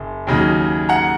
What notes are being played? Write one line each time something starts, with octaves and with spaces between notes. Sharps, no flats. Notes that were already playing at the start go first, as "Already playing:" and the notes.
Already playing: F#1
D#2 C#3 F#3 D#4
F#5 A#5